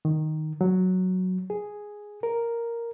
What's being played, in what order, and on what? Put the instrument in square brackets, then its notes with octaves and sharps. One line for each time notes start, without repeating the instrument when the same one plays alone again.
[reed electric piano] D#3
F#3
G#4
A#4